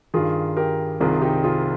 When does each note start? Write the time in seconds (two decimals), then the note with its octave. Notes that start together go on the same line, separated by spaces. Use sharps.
0.14 G2 D#3 F4 G#4
0.57 G4 A#4
1.01 C2 C3 D#3 F4 G#4
1.21 D#4 G4
1.44 F4 G#4